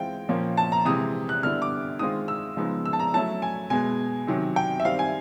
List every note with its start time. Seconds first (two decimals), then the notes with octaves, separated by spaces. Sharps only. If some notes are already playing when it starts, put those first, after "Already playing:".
Already playing: E3 G#3 C4 F4 G5
0.29 A#2 F3 A#3 C#4
0.57 A5
0.72 A#5
0.85 C3 E3 G#3 D#6
1.29 F#6
1.43 D3 G3 B3 E4 F6
1.62 D6
1.99 D#3 G#3 C4 F4 D#6
2.28 E6
2.57 C#3 F3 G#3 B3 D#4
2.85 E6
2.93 A5
2.99 A#5
3.14 F#3 A3 C#4 E4 A5
3.42 G#5
3.70 B2 G#3 B3 G#5
4.27 C3 D#3 F#3
4.56 G5
4.80 E5
4.85 D#3 G3 C4 F5
4.99 G#5